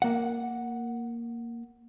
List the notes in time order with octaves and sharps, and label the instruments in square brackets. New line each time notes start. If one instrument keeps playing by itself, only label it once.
[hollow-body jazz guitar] A#3 F#5